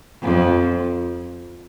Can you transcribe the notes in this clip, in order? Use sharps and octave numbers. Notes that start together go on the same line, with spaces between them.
F2